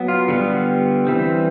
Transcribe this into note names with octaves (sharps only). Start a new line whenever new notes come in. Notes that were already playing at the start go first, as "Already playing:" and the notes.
Already playing: F#3 B3
F4
D3 G3 B3
E3 G3 C4